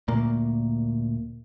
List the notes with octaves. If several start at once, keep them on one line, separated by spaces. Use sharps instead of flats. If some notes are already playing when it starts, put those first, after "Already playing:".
D2 A#2 A#3